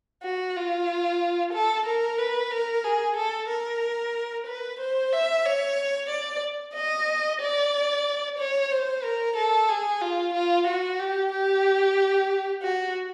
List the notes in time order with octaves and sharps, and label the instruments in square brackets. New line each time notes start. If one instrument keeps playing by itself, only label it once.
[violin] F#4
F4
A4
A#4
B4
A#4
G#4
A4
A#4
B4
C5
E5
C#5
D5
D#5
D5
C#5
C5
A#4
A4
G#4
F4
F4
F#4
G4
G4
F#4